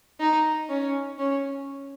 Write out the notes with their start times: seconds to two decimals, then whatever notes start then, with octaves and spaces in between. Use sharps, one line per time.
0.20 D#4
0.69 C#4
1.18 C#4